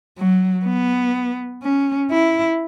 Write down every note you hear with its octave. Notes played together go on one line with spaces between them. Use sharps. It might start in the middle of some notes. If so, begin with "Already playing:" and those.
F#3
B3
C#4
E4